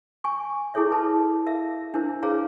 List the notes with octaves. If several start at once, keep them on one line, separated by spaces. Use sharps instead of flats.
G#5 C#6
E4 G#4 A4 C#5 E5
A4 B4 A5 B5
A#4 E5 F5
D4 E4 A#4 C5
G#4 B4 C#5 F5 A#5